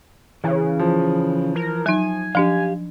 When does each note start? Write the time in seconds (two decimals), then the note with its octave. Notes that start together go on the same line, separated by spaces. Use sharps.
0.44 C#3 E3
0.79 F3
1.56 A#4
1.86 F#3 D#4 G#5
2.35 F3 D4 G4 F5